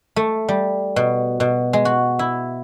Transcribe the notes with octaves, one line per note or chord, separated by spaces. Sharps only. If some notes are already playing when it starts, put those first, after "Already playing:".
A3
G3
B2
B2
G#3
F#4
E4